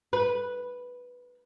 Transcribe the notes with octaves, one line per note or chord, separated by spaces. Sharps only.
B4